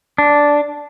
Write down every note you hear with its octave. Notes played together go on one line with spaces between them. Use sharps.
D4